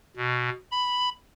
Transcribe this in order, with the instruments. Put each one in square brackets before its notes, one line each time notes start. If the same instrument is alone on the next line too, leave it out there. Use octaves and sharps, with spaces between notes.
[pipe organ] B2
B5